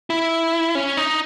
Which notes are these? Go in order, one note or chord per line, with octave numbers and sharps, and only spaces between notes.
E4
C#4
D#4